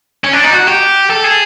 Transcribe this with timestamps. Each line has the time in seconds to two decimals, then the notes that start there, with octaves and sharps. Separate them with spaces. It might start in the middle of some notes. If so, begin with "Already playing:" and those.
0.24 C#4
0.33 D4
0.44 D#4
0.53 F#4
0.68 G4
1.10 A4
1.24 G#4